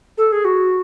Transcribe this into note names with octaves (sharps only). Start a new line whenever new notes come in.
A4
G#4
F#4